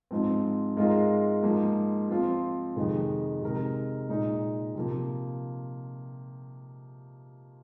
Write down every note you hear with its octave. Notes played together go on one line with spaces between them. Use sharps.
G#2 F3 C4
G#2 G#3 F4 A#4
G#2 F3 A#3
F3 C4 F4
F2 C3 D#3 G#3
C3 G#3 D#4 A#4
A#2 G#3 D#4 G#4
C3 F3 A#3